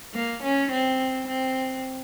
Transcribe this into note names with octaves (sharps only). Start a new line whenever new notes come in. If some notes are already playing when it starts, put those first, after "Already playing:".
A#3
C#4
C4
C4